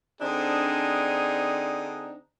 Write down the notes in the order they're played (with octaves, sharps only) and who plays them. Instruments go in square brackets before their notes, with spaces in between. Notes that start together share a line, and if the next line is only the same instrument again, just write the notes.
[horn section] D3 C4 D4 D#4 G#4